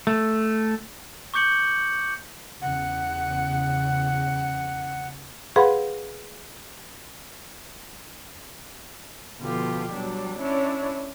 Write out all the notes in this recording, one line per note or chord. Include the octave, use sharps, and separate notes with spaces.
A3
C#6 D6 G6 C#7 F#7
E2 C#3 F#5
G#4 B4 F5 F#5 B5 C6
B2 D3 F3 F4 G4
F#3 G3 D4
C#4 D4 E4 C#5